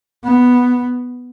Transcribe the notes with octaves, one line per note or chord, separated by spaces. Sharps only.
B3